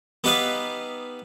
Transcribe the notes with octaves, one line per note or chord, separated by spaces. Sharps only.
B3 D#4 G4 B4 E5 F5